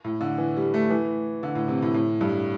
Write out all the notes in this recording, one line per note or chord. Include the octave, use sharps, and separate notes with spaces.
A2
D3
E3
G3
A3
E3
D3
A2
C3
A2
A2
G2